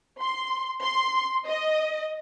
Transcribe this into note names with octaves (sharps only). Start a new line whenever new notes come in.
C6
C6
D#5